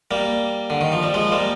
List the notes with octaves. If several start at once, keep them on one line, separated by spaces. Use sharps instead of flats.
G3 A#3
D3
D#3
F3
G3
F3 G#3
G3 A#3